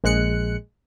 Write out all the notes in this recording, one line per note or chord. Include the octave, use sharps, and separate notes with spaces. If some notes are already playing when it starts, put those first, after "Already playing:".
A#1 G#3 F#6 C#7